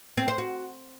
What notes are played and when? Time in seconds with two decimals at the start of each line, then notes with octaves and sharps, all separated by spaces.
0.17 C4
0.28 C5
0.38 F#4